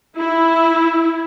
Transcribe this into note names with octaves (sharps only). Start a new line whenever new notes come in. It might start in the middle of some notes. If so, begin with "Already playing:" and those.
E4